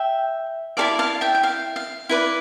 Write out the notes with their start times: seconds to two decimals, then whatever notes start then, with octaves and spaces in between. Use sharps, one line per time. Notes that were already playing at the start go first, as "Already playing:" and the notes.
Already playing: E5 G5
0.77 E4 A4 D5 F5 A5
0.99 F5 A5
1.21 E5 G5
1.35 G5
1.43 F5
1.76 F5
2.09 E4 B4 D5